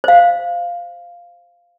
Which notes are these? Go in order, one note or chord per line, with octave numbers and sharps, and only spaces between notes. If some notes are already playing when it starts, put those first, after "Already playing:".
C5 F5